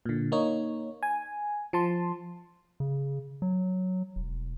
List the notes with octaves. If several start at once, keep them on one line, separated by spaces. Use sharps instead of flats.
A#2 D3
A#3 D#4 C#5
G#5
F3 A5 C6
C#3
F#3
E1